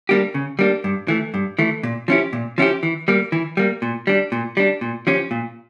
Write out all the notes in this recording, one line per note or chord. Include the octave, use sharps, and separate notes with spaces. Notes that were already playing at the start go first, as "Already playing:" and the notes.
G3 A#3 D4 G4
C#3
G3 A#3 D4 G4
G2
E3 A3
G2
E3 A3
A#2
F3 C#4 E4 G4
A#2
F3 C#4 E4 G4
E3
G3 A#3
E3
G3 A#3
A#2
G3 D4
A#2
G3 D4
A#2
F3 C#4 G4
A#2